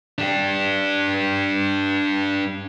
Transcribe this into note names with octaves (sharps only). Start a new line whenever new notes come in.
D4 G4